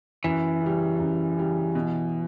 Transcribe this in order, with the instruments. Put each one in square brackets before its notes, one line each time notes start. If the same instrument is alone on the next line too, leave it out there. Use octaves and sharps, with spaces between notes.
[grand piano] F#2 [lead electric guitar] E3
[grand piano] C#3 G3
F#2
C#3 G3
B2